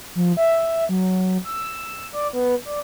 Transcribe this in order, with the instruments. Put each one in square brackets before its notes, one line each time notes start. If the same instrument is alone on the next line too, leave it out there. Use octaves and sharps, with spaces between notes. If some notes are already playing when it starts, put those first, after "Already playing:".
[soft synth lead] F3
E5
F#3
E6
D5
B3
D5